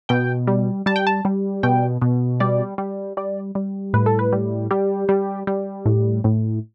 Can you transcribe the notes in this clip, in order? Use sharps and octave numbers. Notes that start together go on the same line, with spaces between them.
B2 G5
G3
G3 A5
G5
A5
G3
B2 G5
B2
G3 D5
G3
G3 D5
G3
A2 B4
A4
B4
G3
G3 G4
G3
G3
A2
A2